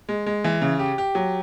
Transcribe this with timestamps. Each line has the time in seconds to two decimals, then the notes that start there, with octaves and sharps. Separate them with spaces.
0.09 G#3
0.26 G#3
0.44 E3
0.62 C#3
0.79 G4
0.98 G4
1.15 F#3